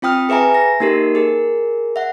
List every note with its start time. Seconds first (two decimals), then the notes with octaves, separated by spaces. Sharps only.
0.02 C4 F4 G5 D#6 F6
0.29 G#4 B4 E5 G#5 A#5
0.54 A#6
0.80 A#3 D#4 G4 A4 A#4
1.15 G#4 A#4
1.96 E5 F#5